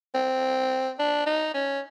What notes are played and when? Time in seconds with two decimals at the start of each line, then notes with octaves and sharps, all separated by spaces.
0.15 C4
0.99 D4
1.26 D#4
1.54 C#4